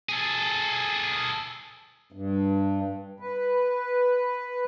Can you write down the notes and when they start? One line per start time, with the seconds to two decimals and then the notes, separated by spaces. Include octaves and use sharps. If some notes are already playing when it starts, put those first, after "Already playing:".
0.09 G#4 A4
2.12 G2
3.20 B4